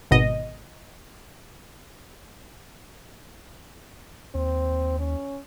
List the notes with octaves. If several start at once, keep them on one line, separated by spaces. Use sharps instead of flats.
G#1 B2 D#5
D#2 C4
C#4